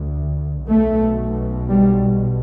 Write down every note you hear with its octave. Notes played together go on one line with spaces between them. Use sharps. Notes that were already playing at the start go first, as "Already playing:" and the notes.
Already playing: D2
B1 B2 A3
G3